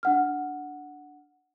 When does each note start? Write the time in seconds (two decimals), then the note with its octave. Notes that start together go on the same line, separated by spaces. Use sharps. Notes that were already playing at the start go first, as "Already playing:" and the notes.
0.03 D4 F#5 F6